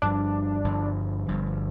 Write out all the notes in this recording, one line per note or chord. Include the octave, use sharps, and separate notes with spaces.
G1 G2 F3 D4
G1 G2 F3
G1 G2 F3